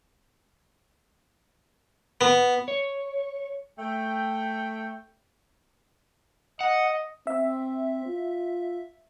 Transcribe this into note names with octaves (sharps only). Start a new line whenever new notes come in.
B3
C#5
A3 G5
D#5 F#5
C4 E5
F4